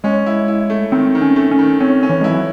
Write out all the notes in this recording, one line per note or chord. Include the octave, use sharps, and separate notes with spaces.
G#3 C#4
E4
E4
A3
D#3 C4
D#3
C#4
A3
C#4
D#3
C4 C#4
C#4
E3
G#3 E4
F#3